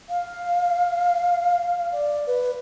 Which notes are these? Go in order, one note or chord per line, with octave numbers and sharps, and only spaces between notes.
F5
D5
B4